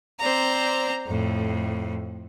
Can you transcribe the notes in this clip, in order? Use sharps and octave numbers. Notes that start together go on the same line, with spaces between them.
C4 C5 D5 A#5
F2 A2